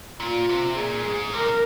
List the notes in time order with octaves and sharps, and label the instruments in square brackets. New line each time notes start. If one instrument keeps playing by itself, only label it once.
[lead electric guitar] A#2 [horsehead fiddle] F4
[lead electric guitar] C3
[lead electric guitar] A#2 [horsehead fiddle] G#4
[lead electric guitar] G#2
[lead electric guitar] C3 [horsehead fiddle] A#4
[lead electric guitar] A#2